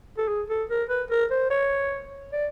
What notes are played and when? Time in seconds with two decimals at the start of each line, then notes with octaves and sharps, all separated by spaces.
0.18 A4
0.28 G#4
0.50 A4
0.70 A#4
0.89 B4
1.11 A#4
1.31 C5
1.50 C#5
2.33 D5